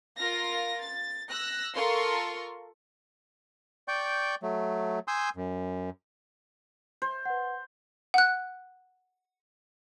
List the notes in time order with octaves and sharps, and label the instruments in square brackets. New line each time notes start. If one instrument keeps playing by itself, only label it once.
[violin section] F4 A#4 F5 A#6
A6
E6 F#6 A#6
F4 A4 A#4 C6 C#6
[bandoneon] D5 G5 C#6 G6
F#3 A3
G#5 C6 D#6 E6 G6
F#2
[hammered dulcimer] C5
[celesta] B4 F#5
[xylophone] F#5 F#6